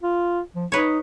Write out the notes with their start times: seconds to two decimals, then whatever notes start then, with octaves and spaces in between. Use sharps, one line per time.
0.03 F4
0.55 F3
0.72 D#4 B4 C#5